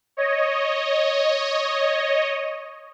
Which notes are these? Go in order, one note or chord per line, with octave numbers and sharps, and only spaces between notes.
C#5 D#5